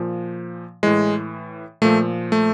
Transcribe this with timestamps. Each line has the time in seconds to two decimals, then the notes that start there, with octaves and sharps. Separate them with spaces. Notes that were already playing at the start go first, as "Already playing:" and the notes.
Already playing: A#2 F3
0.83 A2 E3 G#3
1.82 A#2 F3 A3
2.32 A3